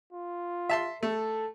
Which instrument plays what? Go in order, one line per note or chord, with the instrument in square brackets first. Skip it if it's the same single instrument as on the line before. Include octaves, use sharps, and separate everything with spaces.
[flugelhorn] F4
[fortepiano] E5 A5 C6
[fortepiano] A3 [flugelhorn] A4